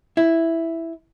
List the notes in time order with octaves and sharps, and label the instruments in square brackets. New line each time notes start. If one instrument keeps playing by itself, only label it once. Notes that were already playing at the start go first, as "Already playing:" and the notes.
[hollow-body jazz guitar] E4